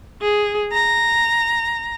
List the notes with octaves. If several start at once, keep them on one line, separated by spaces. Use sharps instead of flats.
G#4
A#5